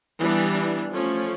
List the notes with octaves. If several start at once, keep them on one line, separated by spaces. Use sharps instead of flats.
E3 G3 B3 D4
F3 A3 C#4